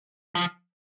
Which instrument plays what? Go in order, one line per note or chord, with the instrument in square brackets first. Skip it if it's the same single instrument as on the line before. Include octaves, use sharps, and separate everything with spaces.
[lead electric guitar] F3